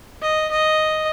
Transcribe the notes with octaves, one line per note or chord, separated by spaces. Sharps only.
D#5
D#5